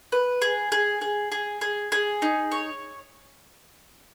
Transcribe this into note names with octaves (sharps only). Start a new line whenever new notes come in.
B4
G#4
G#4
G#4
G#4
G#4
G#4
D#4
C#5